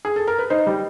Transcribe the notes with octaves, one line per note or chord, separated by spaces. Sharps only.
G#4
A4
A#4
B4
D#4 C5
G3